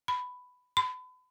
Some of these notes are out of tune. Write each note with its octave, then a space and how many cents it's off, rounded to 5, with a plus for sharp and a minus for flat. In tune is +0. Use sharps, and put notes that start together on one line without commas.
B5 +10
B5 +35